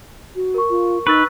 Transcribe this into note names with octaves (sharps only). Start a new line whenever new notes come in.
F#4
A#4 C#6
F4
D#4 B4 C#6 E6 A6